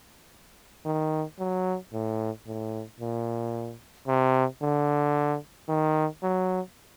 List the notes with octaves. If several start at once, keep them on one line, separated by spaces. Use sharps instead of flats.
D#3
F#3
A2
A2
A#2
C3
D3
D#3
F#3